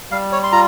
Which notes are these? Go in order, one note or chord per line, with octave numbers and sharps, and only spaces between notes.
G3 F5
C#5
C6
F4 A#5